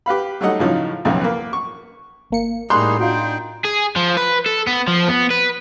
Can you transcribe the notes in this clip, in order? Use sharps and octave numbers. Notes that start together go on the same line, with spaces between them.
G4 B4 F5 B5
F#3 G3 A3 D#4 D#5 F#5
A2 C#3 F3 F#3 D#4
B1 F2 A2 C#3 E3
A#3 B4
C#6
G#1 A#3 C#7
A2 G3 A#3 D#4 G#4 C6 F#6 G6
D4 D#4 F4 F#4 G5
G#4
F3
B4
A4
B3
F3
B3
B4